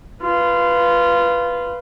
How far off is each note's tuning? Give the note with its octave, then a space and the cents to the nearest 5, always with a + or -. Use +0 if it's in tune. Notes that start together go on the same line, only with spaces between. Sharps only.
F4 -15 B4 +0